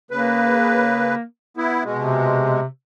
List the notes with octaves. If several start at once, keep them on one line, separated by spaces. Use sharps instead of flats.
C#3 A#3 B4
B3 E4
B2 G#3
C3